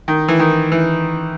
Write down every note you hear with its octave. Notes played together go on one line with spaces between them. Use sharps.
D#3
E3
D#3
E3